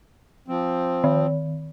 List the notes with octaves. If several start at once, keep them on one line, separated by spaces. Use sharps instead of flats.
F3 C4
D#3